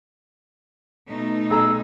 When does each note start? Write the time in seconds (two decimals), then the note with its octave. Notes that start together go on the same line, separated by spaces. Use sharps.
1.08 B2 A3 D#4
1.50 B1 G#4 A#5 E6